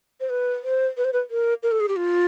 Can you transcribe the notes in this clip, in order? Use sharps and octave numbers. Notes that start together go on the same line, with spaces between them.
C5
B4
C5
B4
C5
B4
A#4
A#4
A4
G#4
G4
F4